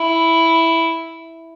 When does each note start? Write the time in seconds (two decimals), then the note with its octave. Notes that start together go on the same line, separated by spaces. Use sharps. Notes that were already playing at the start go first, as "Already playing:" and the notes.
Already playing: E4